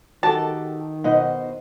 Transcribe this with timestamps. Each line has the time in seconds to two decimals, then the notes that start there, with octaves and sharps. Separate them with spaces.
0.23 D#3 F#4 G4 A4 A5
1.04 B2 D#4 C5 D#5 F#5